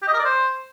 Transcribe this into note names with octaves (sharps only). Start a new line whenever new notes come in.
G4
D#5
A#4
D5
C5